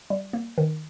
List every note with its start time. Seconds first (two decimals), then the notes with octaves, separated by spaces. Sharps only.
0.10 G3
0.33 A#3
0.58 D#3